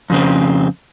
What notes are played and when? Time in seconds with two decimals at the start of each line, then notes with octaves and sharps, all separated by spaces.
0.10 F2 C#3 C4